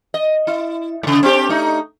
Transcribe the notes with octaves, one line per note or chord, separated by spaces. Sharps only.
D#5
E4
G#2 C#3
C4 D4 G4
A3 D#4